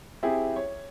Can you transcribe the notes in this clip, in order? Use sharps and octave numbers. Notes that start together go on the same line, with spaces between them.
C4 E4 G4 G#4
C#5